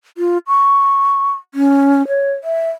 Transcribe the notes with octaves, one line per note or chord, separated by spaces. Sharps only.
F4
C#6
C#4
C#5
E5